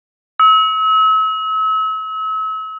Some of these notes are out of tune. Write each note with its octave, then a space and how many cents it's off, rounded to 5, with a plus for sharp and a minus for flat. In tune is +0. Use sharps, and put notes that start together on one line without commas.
E6 -40